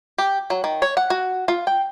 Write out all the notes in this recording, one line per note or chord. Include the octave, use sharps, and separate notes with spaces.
G4
F#3
D#3
C#5
F#5
F#4
F4
G5